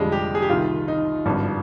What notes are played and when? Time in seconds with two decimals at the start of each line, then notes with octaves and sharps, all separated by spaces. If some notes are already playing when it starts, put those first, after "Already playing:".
Already playing: F1 F2 D3 F3 G3 G#3
0.12 G4
0.35 G#4
0.42 G4
0.50 C2 C3 D#3 F4
0.88 D#4
1.25 G#1 G2 D3 F3